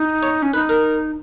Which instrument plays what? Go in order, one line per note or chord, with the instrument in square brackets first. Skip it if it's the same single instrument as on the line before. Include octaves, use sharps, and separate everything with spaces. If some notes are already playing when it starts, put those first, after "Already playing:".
Already playing: [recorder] D#4
[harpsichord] C#5
[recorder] C#4
[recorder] D#4 [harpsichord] B4
[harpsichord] A#4